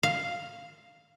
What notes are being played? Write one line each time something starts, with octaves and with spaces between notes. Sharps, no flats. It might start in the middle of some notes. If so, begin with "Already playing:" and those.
F5